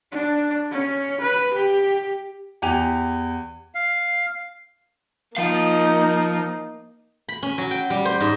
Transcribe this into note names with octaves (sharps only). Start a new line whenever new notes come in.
D4
C#4
B4
G4
E2 G4 G#5 F7
F5
F3 A#3 D#4 F5
B5
C#4
F#3
G5
G3
C5
G#2